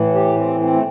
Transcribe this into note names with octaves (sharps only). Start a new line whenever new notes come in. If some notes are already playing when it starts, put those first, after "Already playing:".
Already playing: A2 E3
G4
C4
C4
A3